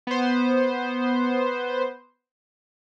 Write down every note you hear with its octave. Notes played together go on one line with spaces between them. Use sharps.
B3 C5